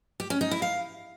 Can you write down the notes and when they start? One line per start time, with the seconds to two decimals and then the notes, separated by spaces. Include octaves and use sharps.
0.20 G4
0.30 C#4
0.41 D#4
0.51 E4
0.62 F5